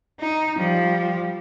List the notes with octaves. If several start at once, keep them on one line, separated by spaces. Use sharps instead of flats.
D#4
F3 G3